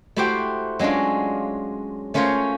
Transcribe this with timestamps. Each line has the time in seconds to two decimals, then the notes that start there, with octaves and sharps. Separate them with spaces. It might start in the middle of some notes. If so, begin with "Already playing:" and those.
0.16 A3 E4 F#4 G4 C5 G5
0.79 F#3 G#3 C#4 D4 F4
2.14 A3 C#4 F4 A#4 C5 C#5